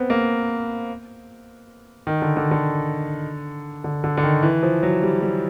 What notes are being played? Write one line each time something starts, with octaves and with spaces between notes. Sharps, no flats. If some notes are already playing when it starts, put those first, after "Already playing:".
Already playing: B3 C4
A#3
D#3
D3
D3
D3
D3
D3
D3
D#3
E3
F3
F#3
G3
G3